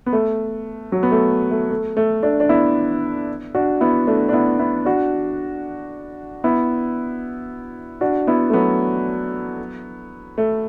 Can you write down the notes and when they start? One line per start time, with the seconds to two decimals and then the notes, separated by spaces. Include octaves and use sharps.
0.06 B3
0.13 A3
0.92 F#3
1.03 B3
1.11 A3
1.51 A3
1.70 A3
1.97 A3
2.23 A3 D4
2.40 D4
2.49 B3 E4
3.55 D4 F#4
3.81 B3 E4
4.07 A3 D4
4.29 D4
4.33 B3 E4
4.59 B3 E4
4.85 D4 F#4
6.44 B3 E4
8.01 D4 F#4
8.27 B3 E4
8.50 A3
8.54 F#3 B3
10.38 A3